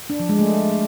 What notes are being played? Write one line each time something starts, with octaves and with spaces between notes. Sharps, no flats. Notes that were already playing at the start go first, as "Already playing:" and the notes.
D4
F3
G#3
A3